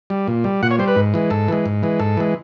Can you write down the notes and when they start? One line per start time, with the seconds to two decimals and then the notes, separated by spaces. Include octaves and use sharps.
0.10 G3
0.28 A#2
0.44 G3
0.63 A#2 F#5
0.71 C#5
0.79 G3 C5
0.88 B4
0.96 G#2
1.14 E3 G#3
1.30 G#2 A4
1.48 E3 G#3
1.66 G#2
1.83 E3 G#3
2.00 G#2 A4
2.17 E3 G#3